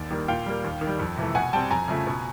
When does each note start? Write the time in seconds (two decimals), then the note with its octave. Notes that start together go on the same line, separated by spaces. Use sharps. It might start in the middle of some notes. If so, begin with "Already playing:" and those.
Already playing: D#2 D5
0.11 D#3 G3 A#3
0.28 A#2 F5 G5
0.46 G3 A#3
0.64 D#2
0.81 D#3
0.87 G3
0.99 F2
1.17 C3 E3 A3
1.35 B2 F#5 G#5
1.53 G3 C4 G5 A5
1.70 F2 G#5 A#5
1.88 C#3 F3 A3
2.07 B2